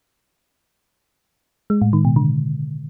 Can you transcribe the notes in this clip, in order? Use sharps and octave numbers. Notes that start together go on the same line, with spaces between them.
G#3
A2
D#3
B2
D3